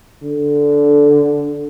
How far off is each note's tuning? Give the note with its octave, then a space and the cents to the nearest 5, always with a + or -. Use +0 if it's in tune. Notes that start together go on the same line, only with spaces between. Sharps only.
D3 -5